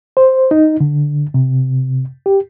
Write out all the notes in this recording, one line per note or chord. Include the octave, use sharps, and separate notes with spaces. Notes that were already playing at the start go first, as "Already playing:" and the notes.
C5
D#4
D3
C3
G4